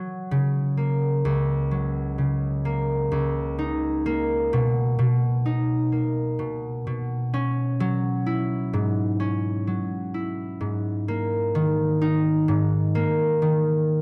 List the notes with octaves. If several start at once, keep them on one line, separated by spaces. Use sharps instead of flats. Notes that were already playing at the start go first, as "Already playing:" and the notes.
Already playing: F#3
C#3
A#3
C#2
F#3
C#3
A#3
C#2
D#4
A#3
B2
B2
D#4
A#3
B2
B2
C#4
F#3
E4
G#2
C#4
F#3
E4
G#2
A#3
D#3
D#4
G#2
A#3
D#3